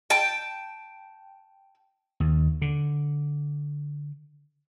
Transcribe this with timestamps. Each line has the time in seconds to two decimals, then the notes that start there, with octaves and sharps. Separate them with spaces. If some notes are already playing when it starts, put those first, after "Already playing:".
0.10 G5 A5
2.20 D#2
2.62 D3